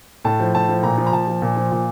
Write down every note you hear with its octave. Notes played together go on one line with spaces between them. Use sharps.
A2 A5
F3
A2 A5
F3
A#2 A#5
F3
A#5
A#2 A5
F3
A#2
F3
A#2